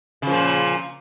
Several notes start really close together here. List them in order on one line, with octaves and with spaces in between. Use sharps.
C#3 F3 A#2